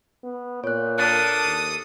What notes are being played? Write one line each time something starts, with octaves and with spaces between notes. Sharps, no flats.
B3
A#2 C#5 F#6
D4 A4 A#4 D#6 F#6 A6
D#2